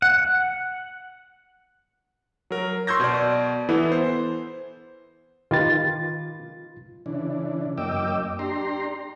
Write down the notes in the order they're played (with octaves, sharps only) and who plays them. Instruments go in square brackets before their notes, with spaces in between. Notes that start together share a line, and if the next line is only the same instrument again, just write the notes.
[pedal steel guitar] F#5
[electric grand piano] F#3 A#4
C6 C#6 E6 G6 G#6 A#6
B2 D5
E3 B3 E4 A4
C5
[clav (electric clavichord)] D#3 G4 B4 [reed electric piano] F4 A6
[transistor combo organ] C#3 E3 D4
F#2 A#3 D#5 G5 D6 E6
D4 G4 A#5 C6